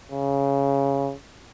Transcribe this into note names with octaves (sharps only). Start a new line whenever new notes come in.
C#3